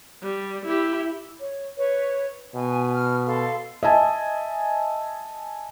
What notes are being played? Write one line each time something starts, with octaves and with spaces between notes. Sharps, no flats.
G3
E4 G4
C#5
B4 C#5
B2 G#5
F6
A4 F5 C6
D#5 E5 G#5 A5